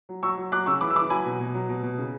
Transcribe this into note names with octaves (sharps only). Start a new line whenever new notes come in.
F#3
F#3 C#6 E6
F#3
F#3 D6 F#6
C#3 C#6 E6
E3 B5 D6
E6
E3 B5 D6
F#3 G#5 B5
B2
B2
F#3
B2
B2
C#3